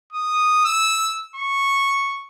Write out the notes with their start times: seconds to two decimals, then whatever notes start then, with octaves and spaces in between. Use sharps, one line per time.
0.13 D#6
0.65 E6
1.36 C#6